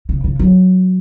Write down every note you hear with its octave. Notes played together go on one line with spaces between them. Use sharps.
C#3
C#3
F#3